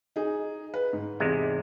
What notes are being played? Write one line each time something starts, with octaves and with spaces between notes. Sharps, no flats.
D#4 G#4
B4
G#2
E2 C3 G#3